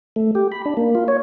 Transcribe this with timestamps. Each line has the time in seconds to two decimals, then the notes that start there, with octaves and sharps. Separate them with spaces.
0.16 A3
0.35 G4
0.52 B5
0.66 D4
0.77 A#3
0.95 F4
1.08 C#5